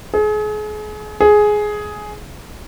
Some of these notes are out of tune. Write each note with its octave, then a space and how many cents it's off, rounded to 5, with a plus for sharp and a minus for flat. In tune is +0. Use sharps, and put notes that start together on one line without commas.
G#4 +35
G#4 +10